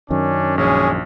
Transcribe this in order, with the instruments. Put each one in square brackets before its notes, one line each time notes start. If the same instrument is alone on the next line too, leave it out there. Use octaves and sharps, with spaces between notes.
[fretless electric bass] F#2 D#3 [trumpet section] C#4 D4
[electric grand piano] A#1 [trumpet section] G#3 [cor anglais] C#4